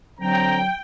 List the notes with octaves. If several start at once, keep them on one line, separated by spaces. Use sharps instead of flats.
D3 F#3 C4 G5 A#5